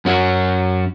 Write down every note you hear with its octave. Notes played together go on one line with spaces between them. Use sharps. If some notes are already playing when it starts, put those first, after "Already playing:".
F#2 C#4 F#4